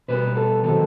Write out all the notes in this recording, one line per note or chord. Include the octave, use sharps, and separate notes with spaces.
B2 G3 B3 B4
A4
D#3 F#3 C4 A4